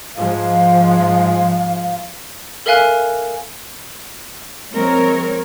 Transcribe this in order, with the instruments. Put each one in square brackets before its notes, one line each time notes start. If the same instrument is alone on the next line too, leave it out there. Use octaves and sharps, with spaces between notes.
[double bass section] G#2 F3 G#3 [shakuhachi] F5
[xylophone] A4 A#4 E5 F5 G#5 F#6
[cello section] F3 G#3 C4 A#4 C#5